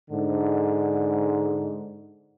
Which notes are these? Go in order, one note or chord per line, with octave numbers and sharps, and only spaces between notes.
G#2 D3